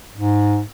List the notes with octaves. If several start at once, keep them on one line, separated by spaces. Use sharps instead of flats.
G#2